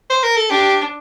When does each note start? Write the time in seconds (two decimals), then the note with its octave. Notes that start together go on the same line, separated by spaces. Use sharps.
0.10 C5
0.23 A#4
0.37 A4
0.50 D4 G4